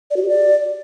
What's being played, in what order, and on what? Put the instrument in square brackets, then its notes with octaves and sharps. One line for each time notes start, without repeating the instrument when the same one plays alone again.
[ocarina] D5
F#4
G4
D5